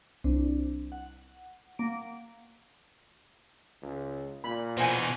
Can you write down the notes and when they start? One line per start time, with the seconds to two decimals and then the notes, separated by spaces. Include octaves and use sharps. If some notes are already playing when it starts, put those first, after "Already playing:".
0.24 C2 C4 D4
0.92 F#5
1.79 A#3 D7
3.82 C#2
4.44 A#2 B5
4.77 B2 E3 C5 G#5